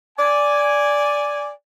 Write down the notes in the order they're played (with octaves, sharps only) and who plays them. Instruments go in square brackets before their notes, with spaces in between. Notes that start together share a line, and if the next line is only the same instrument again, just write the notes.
[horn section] D5 G#5